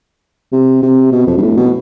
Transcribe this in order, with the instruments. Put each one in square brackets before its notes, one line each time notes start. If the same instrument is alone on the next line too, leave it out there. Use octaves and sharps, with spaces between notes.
[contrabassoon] C3
C3
B2
F2
G2
A2
B2